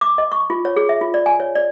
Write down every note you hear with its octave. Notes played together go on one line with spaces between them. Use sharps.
D6
D#5
C#6
F4
C#5
G#4
E5
F4
D5
G#5
C#5
D5